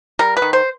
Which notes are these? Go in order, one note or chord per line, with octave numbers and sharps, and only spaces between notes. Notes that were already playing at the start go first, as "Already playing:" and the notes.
G3 A#4
B4
D#3
C5